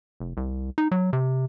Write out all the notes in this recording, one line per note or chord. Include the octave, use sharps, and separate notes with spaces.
F1
C2
D#4
F#3
C3